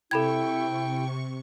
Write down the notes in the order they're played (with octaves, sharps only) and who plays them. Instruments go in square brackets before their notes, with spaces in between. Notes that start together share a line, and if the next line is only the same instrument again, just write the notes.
[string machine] C3 C#6 [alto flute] E4 [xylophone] A4 B5 G#6 [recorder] G5